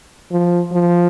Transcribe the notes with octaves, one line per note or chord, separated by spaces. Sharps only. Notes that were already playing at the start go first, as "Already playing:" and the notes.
F3
F3